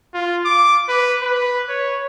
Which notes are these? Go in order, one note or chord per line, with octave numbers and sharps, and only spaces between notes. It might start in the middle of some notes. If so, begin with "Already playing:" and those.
F4
D6
B4
B4
C#5